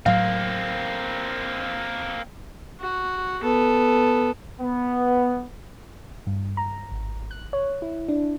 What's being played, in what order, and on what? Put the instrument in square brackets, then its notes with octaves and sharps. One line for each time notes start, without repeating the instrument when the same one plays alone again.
[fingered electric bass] A2 F#3 [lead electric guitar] A#3 C4 [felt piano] F5
[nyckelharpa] F#4
B3 A4
[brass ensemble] B3
[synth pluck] G2
A#5
G#1
F#6
C#5
E4
D4